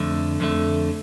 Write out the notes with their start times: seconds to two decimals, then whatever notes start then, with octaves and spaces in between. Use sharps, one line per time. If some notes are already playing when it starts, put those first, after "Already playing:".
Already playing: F2 D3 A3
0.40 F2 D3 A3